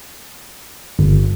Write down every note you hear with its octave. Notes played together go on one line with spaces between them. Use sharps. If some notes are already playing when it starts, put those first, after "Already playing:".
G1